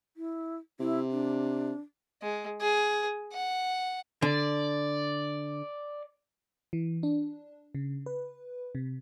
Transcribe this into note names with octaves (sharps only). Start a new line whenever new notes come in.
E4
C3 E4
D4
G#3
G#4
F#5
D3 D5
E3
D4
C#3
B4
C3